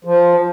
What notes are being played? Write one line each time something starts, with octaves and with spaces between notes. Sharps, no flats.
F3